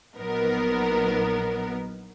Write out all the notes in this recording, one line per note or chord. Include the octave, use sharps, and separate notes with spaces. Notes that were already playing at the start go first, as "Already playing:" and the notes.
A#1 F#3 B3 D#4 A#4